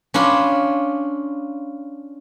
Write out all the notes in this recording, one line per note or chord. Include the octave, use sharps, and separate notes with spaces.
C#4 D4 F4 B5 C6